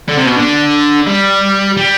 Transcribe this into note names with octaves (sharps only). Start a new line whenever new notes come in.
D3
C3
B2
D3
G3
G3